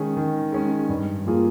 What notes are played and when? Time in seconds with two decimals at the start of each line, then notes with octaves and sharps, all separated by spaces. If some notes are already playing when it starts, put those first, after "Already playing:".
Already playing: D#3 G#3 C#4 G#4
0.17 D#3
0.52 G#3 C#4 G#4
0.89 G2
1.26 F3 A#3 F4 G#4